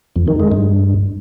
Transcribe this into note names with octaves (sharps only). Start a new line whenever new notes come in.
F2
D#3
G#3
G2